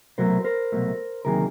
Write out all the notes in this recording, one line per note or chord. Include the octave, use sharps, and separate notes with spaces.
C2 B2 F#3 A3 A#4 C5
A#4 C5
C2 B2 F#3 A3
D2 C3 D#3 F#3 A#3 G#4 A#4